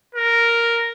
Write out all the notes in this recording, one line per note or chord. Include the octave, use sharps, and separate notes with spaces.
A#4